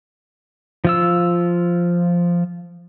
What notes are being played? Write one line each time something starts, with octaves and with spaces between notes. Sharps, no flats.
F3 F4 E6